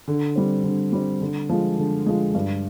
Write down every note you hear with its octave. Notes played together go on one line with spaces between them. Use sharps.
D3
G3 C4
D3
G3 C4
D3
F3 G#3
D3
F3 G#3
G2